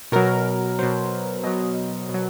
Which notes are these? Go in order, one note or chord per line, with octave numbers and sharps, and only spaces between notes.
B2 F#3 A#4
B2 F#3 C5
B2 F#3 D#5
B2
F#3